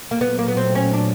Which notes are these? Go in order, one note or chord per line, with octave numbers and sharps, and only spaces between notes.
A#3
A#2 F#3 A3 B3
A#3
B3
C4
C#4
D4